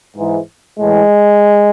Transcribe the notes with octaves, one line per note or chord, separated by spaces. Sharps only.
G#2 E3
A2 E3 G#3